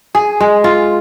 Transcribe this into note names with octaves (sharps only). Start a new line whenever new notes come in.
G#4
G#3
F4